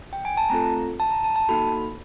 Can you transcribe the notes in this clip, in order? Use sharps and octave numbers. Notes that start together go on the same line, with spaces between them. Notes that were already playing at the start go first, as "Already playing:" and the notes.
G5
G#5
A5
A3 C4 F4 A4 A#5
A5
A#5
A5
A5
A#3 D#4 F#4 A4 B5